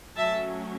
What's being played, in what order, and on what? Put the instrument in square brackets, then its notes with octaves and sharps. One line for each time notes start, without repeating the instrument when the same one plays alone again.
[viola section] F#3 A3 C#4 E5 A5